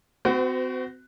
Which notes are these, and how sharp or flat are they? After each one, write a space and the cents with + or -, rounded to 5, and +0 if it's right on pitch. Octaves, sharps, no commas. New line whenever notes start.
C4 -35 F#4 +5 B4 +45